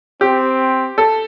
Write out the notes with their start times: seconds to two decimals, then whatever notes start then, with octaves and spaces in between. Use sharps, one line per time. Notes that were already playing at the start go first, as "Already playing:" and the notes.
0.21 C4 G4
0.98 A4